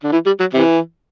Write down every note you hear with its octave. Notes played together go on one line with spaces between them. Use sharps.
D3
E3
G3
F#3
C3 E3